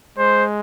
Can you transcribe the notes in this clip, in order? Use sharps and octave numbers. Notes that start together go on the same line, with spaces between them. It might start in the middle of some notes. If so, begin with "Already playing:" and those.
G#3 C5